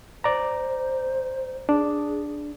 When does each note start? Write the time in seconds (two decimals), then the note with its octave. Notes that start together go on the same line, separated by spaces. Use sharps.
0.24 C5 D5 A#5
1.69 D4 G#4